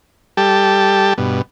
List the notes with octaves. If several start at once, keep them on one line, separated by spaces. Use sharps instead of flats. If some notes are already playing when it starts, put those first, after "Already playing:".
G3 G4 A4 A5
G2 B2